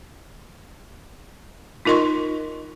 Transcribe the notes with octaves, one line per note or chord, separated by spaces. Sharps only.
D#4 F4 A#4 D#5 C6 C#6